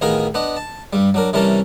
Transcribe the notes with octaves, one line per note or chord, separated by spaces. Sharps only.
A1 D#3 B3 G#4 A#4 F5
B3 D4 D#5
A5
G2 G3
F#3 D4 A#4
C3 E3 G3 C#4 A#4 A5